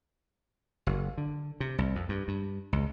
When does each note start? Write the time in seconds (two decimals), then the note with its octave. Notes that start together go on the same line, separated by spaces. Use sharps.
0.87 F#1
1.18 D3
1.60 C3
1.78 C2
1.96 F2
2.09 G2
2.28 G2
2.73 C#2